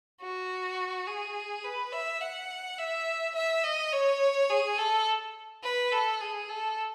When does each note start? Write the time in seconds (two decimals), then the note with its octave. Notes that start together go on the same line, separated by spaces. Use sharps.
0.21 F#4
1.07 G#4
1.64 B4
1.93 E5
2.21 F#5
2.78 E5
3.35 E5
3.63 D#5
3.92 C#5
4.50 G#4
4.78 A4
5.63 B4
5.92 A4
6.21 G#4
6.49 A4